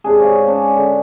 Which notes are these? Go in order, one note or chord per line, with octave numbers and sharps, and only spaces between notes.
G#2 C3 D4 G#4
C#5 F5
C#4 D4
D3